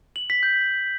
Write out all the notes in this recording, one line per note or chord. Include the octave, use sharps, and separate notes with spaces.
F#7
B6
G6